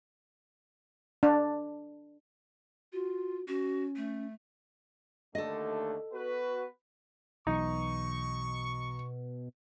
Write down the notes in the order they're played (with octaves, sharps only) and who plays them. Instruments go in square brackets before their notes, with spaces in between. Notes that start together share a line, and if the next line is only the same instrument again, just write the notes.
[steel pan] D4
[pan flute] F4 [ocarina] F#4
[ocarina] C#4 [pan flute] F#4
[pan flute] A3
[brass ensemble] D#2 D3 A3 [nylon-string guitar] A4 D#5
[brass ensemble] B3 F#4 B4
[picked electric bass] B1 E3 F#3 [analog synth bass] B2 [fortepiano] D#4 [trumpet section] C#6